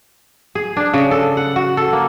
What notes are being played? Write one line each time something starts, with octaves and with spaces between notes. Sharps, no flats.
G#4
D4
C#3
A4
F#5
F#4
A4
A#3